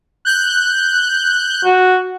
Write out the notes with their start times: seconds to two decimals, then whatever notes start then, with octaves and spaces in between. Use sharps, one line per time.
0.25 F#6 G6
1.65 F#4